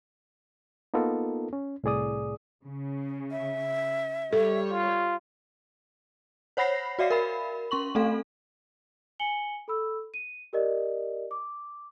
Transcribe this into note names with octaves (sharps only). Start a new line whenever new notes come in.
A#3 B3 D#4 F4 A4 A#4
C#4
C2 A2 G#4 D5 D#6
C#3
E5
G3 A4 C#5
F4
C5 C#5 F#5 B5 A#6 C7
F#4 D5 E5 F5 C7
A#4 B5
C#4 C6 C#6 F#7
A3 C4 A4 F5
G#5 C#7 F#7 G7
A4 B5 E6
D#7
G4 A#4 D5 D#5
D6